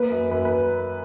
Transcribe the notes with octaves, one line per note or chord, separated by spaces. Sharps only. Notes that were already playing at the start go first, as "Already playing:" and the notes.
Already playing: A#3 B4
F#2
F#2 B4
B4